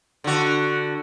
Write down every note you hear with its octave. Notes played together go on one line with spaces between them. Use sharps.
D3 F#4